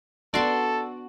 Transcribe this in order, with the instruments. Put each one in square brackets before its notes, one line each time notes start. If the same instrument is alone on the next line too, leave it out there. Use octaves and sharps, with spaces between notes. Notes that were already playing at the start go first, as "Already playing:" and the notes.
[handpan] B3 D4 [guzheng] F#4 C6 [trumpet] A4 [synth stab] D5